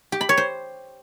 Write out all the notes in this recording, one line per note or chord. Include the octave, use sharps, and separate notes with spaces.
G4
B5
C#5
C5